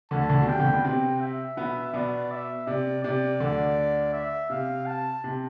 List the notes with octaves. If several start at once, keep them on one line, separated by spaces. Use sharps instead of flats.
D2 D3 A5
D2 D3
B2
C3 G5
D2 D3
B2 B3
C3 C4 G5
E5
B2 B3
B2 B3 D5
E5
C3 D5
C3 D5
D2 D3
E5
C3 F5
A5
C3